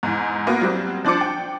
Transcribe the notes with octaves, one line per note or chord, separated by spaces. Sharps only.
E2 G#2
A#3 B3 F#4
F#3 G3 C4
F3 D4 C5 D6 C#7
G5